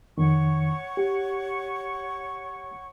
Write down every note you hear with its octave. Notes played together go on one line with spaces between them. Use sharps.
F2 D#3 C#5 F#5 C#6
G4